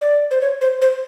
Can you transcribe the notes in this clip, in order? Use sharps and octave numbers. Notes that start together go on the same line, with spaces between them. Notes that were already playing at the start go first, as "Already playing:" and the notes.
D5
C5
C#5
C5
C5